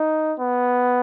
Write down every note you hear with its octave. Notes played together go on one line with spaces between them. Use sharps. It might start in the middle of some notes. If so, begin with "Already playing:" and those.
Already playing: D#4
B3